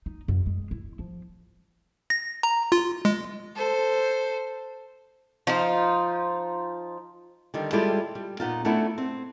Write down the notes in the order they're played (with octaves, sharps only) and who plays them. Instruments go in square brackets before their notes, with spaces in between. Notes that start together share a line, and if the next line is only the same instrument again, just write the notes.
[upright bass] D#4
F#2
G#3
E4
F3
[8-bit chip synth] A#6
A#5
F4
G#3
[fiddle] A4 C5
[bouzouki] F3 D#4 F4
[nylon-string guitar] D3 D#3 G3
G3 G#3 E4 F4 G4 A4
G3
A#2 B3 D#4 F4
A3 B3 C#4 D4 E4
C4